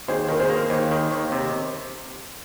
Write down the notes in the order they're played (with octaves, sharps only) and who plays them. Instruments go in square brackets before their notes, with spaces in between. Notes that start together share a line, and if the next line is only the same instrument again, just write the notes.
[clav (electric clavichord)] D#2 [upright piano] G#4 C5
[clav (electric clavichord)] D#3 [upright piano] A#4
[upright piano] G#4 C5
[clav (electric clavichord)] A#3
D#2
D#3
D#2
C3